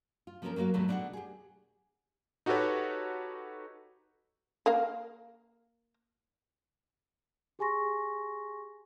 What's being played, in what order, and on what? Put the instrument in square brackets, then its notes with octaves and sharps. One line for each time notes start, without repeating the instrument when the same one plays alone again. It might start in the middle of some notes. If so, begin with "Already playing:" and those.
[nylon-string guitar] F4
F3 A#3 C4 C#4 A4 A#4
F#3 G3 A#3 F#4 F5
D#2 G#2 B2 F#3 G#3 A3
B2 D4 D#4 G#4 A4 F#5
G4 G#4
[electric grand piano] D#4 F#4 G4 A4 B4 C#5
[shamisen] A#3 A#4 F5
[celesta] G4 G#4 G#5 C6 C#6 A#6